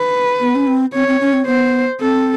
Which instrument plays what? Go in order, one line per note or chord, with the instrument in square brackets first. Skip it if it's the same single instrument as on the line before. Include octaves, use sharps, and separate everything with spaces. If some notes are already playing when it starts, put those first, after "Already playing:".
Already playing: [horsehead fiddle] B4
[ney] B3
C#4
C4
[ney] C4 [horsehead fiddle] C#5
[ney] C4
C#4
C4
[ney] B3 [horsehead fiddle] C5
[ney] C4 [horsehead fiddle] A4